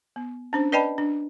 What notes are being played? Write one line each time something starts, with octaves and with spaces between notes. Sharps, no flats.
B3
C#4 D4 C5
B4 D5 D#5 G5 A5 B5
D4